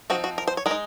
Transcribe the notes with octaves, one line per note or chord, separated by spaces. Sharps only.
F3 C4 D#4 F#4
F#4
A#4
C5
C#5
G#3 A#4
D#4